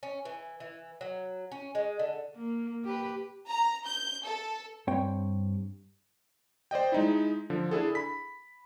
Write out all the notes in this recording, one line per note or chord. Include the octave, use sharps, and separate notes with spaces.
C#4
E3
E3
F#3
C#4
G#3
D3
A#3
G4 B4
A#5
G6
A4
G2 C4 C#5 G5
C5 D5 D#5 G5
G#3 D#4 E4
D3 F3
D4 E4 G#4 A4
B5 B6